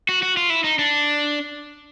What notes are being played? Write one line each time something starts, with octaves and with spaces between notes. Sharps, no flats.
F#4
F#4
F4
E4
D#4
D4